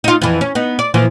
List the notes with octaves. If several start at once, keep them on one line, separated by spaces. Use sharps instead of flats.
D#4 F4
F2 E3
C#4
B3 D#4
D5
A#2 E3 F3